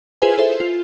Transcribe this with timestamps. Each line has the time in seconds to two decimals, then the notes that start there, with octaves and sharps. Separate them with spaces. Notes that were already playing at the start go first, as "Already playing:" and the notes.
0.22 E4 F4 G#4 B4 C5 G#5
0.38 A4 C5 E5
0.60 F4